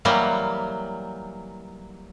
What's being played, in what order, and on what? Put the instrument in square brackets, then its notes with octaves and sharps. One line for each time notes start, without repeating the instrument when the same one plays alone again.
[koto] E3 F#3 G3 A#3